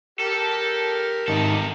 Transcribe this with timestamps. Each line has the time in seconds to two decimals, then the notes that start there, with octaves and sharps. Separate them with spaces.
0.20 G4 A4 A#4
1.28 G#1 C3 D#3 D#4 A4